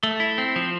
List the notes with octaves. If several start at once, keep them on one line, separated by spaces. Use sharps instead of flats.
A3
E4
C4
F3